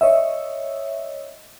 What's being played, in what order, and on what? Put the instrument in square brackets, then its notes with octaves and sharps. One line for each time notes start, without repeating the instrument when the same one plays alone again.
[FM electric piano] C#5 D#5 E5